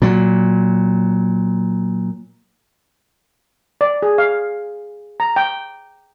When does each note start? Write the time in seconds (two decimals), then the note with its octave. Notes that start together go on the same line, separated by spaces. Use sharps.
0.02 A#2 F#3
3.81 D5
4.02 G#4
4.18 F5
5.20 A#5
5.36 G5